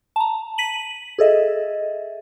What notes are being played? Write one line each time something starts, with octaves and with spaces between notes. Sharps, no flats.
A5 A#5
B6 D#7 F#7
G#4 A4 D#5 E5